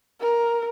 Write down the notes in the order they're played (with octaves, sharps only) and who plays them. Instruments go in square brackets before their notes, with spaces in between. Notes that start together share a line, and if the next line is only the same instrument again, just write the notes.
[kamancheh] A#4